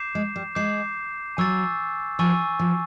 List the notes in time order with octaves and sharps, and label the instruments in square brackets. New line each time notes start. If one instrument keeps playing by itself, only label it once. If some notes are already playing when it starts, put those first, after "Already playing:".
Already playing: [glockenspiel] D6 G6 C7 E7
[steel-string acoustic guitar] G#3
G3
[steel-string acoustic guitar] G#3 [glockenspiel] D6 G6 C7 E7
[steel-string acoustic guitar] F#3 [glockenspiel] G#5 C#6 E6 A6
[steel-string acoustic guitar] F3 [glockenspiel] G#5 C#6 E6 A6
[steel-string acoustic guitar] F3